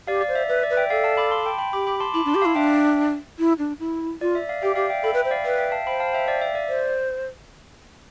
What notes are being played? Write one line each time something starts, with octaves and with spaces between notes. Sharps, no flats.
G4 D5 F5
D5
C5
E5
B4 E5
D5
B4
E5 G5
A4 D5 F5
F5 A5
B5 D6
A5 C6
G5 B5
G5 B5
G4 B5 D6
B5 D6
A5 C6
E4 B5 D6
D4 A5 C6
G4
F5 A5
E4
D4 E5 G5
E4
D4
E4
F4 D5
E5
D5 F5
G4 E5 G5
G4 D5 F5
E5 G5
A4 G5 B5
B4
E5 G5
C5
D5 F5
B4 E5 G5
E5 G5
F5 A5
C5 G5 B5
F5 A5
E5 G5
D5 F5
E5
D5
C5